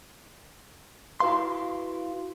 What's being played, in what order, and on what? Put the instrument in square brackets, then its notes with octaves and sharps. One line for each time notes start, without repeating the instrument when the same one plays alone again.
[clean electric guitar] E4 F#4 B4 F5 C6